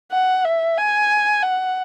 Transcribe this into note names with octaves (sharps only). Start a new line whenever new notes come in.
F#5
E5
G#5
F#5